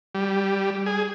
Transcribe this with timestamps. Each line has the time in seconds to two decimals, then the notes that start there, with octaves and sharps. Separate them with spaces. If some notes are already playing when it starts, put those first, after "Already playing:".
0.15 G3
0.86 G#4